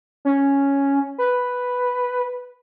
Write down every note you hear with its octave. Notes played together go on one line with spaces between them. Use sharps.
C#4
B4